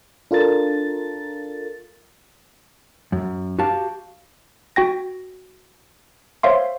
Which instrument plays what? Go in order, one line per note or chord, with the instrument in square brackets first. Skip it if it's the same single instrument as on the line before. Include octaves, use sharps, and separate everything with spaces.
[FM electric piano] D4 F4 A4 A#4 A6
[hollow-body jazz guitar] F#2
F#4 G4 F5 A5
[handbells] F#4 G5 A#6
C5 C#5 E5 F5 C6